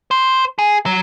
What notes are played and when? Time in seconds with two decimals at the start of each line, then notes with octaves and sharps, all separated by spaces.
0.11 C5
0.59 G#4
0.86 F#3